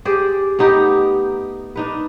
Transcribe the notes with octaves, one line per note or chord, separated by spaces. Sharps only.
G4 G#4 C5 D5
A3 B3 D#4 G4
D4 D#4 B4